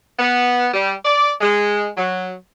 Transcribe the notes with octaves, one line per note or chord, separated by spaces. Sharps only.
B3
G3
D5
G#3
F#3